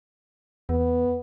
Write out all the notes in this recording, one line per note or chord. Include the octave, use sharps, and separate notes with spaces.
E2 B3